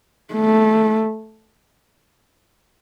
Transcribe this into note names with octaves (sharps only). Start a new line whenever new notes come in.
A3